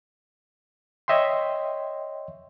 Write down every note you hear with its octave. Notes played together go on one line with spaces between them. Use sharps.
C#5 D#5 E5 G5 C6